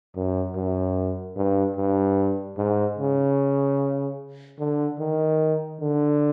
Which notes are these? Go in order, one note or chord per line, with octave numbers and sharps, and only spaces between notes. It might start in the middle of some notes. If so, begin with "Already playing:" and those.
F#2
F#2
G2
G2
G#2
C#3
D3
D#3
D3